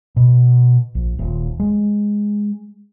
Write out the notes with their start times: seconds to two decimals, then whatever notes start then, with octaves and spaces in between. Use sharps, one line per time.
0.16 B2
0.95 A#1
1.19 D#1
1.60 G#3